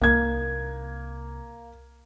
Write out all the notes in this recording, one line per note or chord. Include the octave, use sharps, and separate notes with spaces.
C2 A#3 D#4 G#6